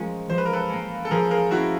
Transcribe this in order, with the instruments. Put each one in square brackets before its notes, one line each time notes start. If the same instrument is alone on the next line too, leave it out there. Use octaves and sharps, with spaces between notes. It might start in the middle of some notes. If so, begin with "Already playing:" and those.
Already playing: [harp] F3 G#3 C#4 [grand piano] A#4
[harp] F3 [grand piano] C5
[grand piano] B4
A#4
A4 B4
[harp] A#3 C#4
[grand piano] A4
[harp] F3 [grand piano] G#4 A#4
[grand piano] G#4 A#4
[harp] A#3 C#4 [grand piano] E4 F#4